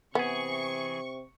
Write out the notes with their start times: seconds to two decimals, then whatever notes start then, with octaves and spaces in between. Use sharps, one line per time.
0.15 C3 E3 B3 G#4 C#6